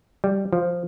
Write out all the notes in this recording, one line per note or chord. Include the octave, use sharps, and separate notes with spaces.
G3
F3